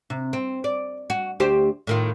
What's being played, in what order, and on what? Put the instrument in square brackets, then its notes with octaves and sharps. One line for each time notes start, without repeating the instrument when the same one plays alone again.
[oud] C3
C4
D5
F#4
D2 G4 C5
A2 D#3 F4